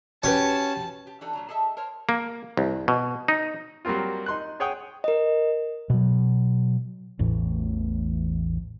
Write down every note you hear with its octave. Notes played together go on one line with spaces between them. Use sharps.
C#4 F#4 G4 B4 A5
G4
E3 D4 D#4 G4 A4
A#2 F#3 A#5
G#4 A4 D#5 E5 A5
A#4 C5 C#5
A#3
C2
B2
D#4
F#3 G3 A#3 C4 F4
D#4 C6 F#6
G#4 C#5 F#5 G5 D#6
A#4 D#5
B2 F#3
A1 E2 A2